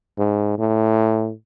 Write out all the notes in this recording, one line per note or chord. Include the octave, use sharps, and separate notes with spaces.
G#2
A2